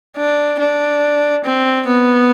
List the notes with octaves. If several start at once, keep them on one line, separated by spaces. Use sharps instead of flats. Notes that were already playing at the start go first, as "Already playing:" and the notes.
D4
D4
C4
B3